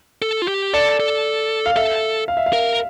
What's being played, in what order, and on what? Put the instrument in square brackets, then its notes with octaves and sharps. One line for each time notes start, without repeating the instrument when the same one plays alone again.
[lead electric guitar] A4
F4
G4
[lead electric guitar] A4 [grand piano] D5
[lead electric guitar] A4
[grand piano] F5
[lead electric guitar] A4 [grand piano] E5
[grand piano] F5
E5
F5
[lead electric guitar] A#4